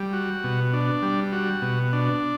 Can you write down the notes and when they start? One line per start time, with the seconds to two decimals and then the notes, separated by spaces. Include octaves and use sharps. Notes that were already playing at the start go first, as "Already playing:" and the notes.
Already playing: G3
0.13 F#4
0.44 B2
0.73 D4
1.02 G3
1.32 F#4
1.62 B2
1.93 D4